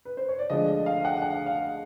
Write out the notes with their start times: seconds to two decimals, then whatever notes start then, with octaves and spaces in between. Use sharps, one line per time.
0.05 B4
0.17 C5
0.28 C#5
0.39 D5
0.50 D2 D3 F3 G#3 D#5
0.68 D#5
0.86 F5
1.05 F#5
1.22 F#5
1.46 F5